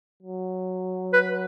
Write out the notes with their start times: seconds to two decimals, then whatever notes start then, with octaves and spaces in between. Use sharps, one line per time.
0.23 F#3
1.13 B4